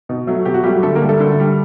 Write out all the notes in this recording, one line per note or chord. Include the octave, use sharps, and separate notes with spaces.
B2 D#4
F#3 A3
B2 G4
F#4
F#3 G3 A3 G4
D3 A3 A4
A#3 A#4
G3
A3 A4
D3
G3